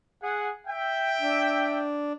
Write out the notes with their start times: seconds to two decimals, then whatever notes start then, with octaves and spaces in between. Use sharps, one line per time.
0.21 G#4 F#5
0.66 E5 G5
1.21 D4